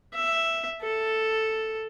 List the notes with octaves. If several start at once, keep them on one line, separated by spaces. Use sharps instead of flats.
E5
A4